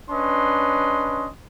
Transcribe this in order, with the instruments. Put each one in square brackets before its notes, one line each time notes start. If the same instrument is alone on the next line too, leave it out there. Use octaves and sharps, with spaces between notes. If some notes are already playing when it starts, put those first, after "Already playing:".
[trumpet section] C#4 D4 B4 D#5 C6